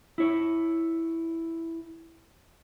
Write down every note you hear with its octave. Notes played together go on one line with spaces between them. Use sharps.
E4 C#5